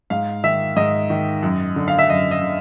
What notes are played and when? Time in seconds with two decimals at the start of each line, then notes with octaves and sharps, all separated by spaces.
0.10 G#2 F5
0.44 D#3 E5
0.76 G#2 D#5
1.10 D#3
1.43 F#2
1.76 D3
1.88 F5
1.99 E5
2.09 F#2 D#5
2.31 D#5
2.43 D3